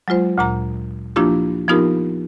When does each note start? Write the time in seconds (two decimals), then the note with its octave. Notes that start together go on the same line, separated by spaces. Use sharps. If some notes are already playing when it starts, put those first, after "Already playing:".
0.08 F#3 G#3 F4 C5
0.38 D2 A#2 A#5
1.16 F3 A#3 D4 E4 F4 G4
1.68 F3 B3 D#4 F4 G4 A#4